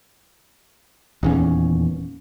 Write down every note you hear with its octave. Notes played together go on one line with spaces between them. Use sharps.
D#1 E2 C#4